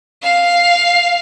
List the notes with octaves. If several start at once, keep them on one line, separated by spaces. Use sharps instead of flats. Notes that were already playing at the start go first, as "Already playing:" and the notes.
F5